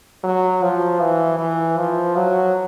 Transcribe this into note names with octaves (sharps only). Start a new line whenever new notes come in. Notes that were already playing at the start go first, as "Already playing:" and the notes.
F#3
F3
E3
E3
F3
F#3